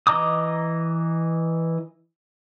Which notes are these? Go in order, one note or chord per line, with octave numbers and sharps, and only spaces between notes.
E3 D#5 A#5 D6 D#6